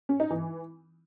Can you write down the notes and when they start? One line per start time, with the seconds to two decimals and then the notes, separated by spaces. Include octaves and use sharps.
0.09 C#4
0.20 D#4
0.30 E3